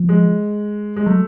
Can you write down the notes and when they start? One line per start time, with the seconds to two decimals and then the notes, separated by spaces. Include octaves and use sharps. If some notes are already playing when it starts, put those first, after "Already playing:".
Already playing: F3
0.09 G#3
0.96 G#3
1.06 F#3 A3